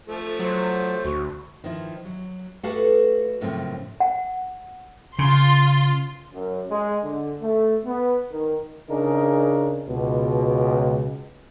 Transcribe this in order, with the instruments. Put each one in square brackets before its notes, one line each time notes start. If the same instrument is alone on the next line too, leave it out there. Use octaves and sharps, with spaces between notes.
[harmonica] F3 A3 [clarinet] A4
[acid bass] F#3 [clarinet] C5
[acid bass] D2 [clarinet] F#4
[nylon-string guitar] D#3 F3 E4
F#3
A3 F#4 G4 A4 B4 F5
F#2 A2 C#3 F3 A#3 C4
[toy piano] F#5
[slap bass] C#3 [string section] F4 C6
[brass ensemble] F#2
G#3
D3
A3
B3
D#3
[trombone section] C#3 D4 D#4 G#4 A#4
C#2 B2